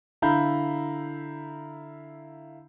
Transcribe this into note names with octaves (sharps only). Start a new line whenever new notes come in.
D3 E4 F5 A#5 B5 G6